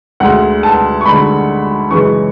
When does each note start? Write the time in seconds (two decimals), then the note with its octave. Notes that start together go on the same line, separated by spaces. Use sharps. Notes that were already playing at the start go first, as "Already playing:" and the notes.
0.20 D2 D3 G#3 F#5
0.63 A5
1.01 C#6
1.05 D2 D3 G#3 B5
1.91 F#2 C#3 E3 G#3 C#6